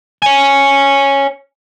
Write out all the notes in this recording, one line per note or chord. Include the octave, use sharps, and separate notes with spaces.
C#5 G#5